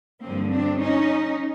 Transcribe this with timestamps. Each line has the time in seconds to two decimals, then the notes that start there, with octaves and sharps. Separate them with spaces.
0.23 G2 D3 F3 A#3 C4
0.52 C4 D4
0.81 C#4 D#4